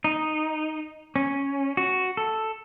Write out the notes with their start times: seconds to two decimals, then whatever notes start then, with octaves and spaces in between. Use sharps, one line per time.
0.04 D#4
1.16 C#4
1.77 F#4
2.17 A4